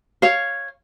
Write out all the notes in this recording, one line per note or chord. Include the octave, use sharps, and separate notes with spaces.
C#5 F5